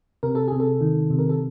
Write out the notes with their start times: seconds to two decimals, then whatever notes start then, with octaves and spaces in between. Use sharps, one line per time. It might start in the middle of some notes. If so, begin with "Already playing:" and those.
0.23 C3 A#4
0.35 A4
0.48 C3 G#4
0.60 A4
0.81 D#3
1.10 C3
1.19 A#4
1.29 A4